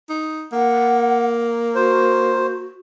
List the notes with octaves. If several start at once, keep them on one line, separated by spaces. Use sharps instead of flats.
D#4
A#3 F#5
F#4 C5